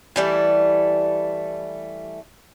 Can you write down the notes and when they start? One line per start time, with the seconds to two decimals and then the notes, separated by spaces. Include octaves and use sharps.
0.16 E3 G3 A3